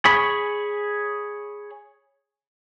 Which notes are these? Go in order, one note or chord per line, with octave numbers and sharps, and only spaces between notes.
G#4 C#5 B5